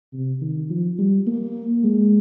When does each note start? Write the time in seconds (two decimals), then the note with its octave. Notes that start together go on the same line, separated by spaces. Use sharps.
0.13 C3
0.41 D#3
0.70 F3
0.99 G3
1.27 A#3
1.84 G#3